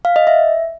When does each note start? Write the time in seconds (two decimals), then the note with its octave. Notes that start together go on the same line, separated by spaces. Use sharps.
0.05 F5
0.16 D#5
0.27 E5